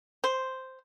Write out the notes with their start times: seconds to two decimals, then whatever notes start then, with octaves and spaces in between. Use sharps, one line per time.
0.24 C5